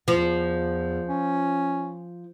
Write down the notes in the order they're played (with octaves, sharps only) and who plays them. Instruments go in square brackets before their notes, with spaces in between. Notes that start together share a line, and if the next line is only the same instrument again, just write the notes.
[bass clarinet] E2 [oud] F3
[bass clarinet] C#4